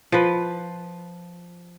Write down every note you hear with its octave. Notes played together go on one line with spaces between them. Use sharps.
F3 B4